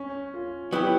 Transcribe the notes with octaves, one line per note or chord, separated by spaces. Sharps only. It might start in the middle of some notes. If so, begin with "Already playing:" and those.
Already playing: C#4
F4
F#3 B3 E4 G4